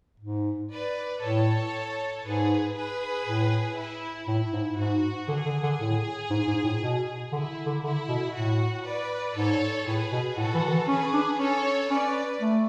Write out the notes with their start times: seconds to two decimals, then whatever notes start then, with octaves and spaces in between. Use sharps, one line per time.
0.20 G#2
0.71 B4 D5
1.21 A2 A4 C#5
2.23 G#2 G#4 B4
2.74 G#4 B4
3.25 A2
3.76 E4
4.27 A2 E4
4.53 G#2
4.77 G#2 F#4
5.28 D3 G#4
5.46 D3
5.63 D3
5.79 A2
6.30 G#2
6.48 G#2
6.64 A2
6.81 B2
7.32 D3 E4
7.66 D3
7.83 D3 E4
8.08 B2
8.33 A2 F#4
8.84 B4 D5
9.35 G#2 A4 C#5
9.87 A2 G#4 B4
10.12 B2
10.37 A2 F#4 A4
10.54 E3
10.67 D3
10.71 E3
10.88 C#4 G#4 B4
11.13 D4
11.39 C#4 A4 C#5
11.90 C#4 B4 D5
12.41 A3